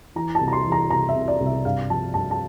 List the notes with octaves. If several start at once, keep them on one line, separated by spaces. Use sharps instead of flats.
E3 A#5
A5
C2
A#5
C6
E3
A#5
C2 A#5
E5
C3
D5
C2
E5
G2 F5
F3 A5
G2 A5
A5